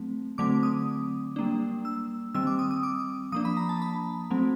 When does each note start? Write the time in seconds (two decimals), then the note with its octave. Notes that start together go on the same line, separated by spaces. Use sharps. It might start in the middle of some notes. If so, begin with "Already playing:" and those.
Already playing: F#3 A3 C4
0.38 D3 F#3 A3 C4 D6
0.63 D#6
1.36 G3 A#3 D4
1.85 E6
2.34 D#3 G3 C4 E6
2.47 D6
2.59 D#6
2.71 D#6
2.83 D6
3.32 F3 A#3 D4 D#6
3.45 B5
3.57 A#5
3.69 A5
3.82 B5
4.30 F#3 A3 C4